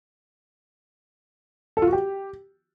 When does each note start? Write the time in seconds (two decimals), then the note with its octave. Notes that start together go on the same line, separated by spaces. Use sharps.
1.77 A4
1.82 F4
1.87 F#4
1.93 G4